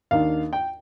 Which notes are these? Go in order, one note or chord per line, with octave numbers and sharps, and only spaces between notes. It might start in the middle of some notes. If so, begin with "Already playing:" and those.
D#2 D#3 A#3 D4 F5
G5